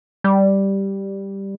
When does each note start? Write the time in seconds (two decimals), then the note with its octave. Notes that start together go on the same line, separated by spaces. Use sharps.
0.24 G3